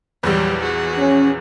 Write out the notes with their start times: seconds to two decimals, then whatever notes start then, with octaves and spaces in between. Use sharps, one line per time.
0.23 A#1 E2 F#3 G3
0.62 F#4 G#4
0.98 C#4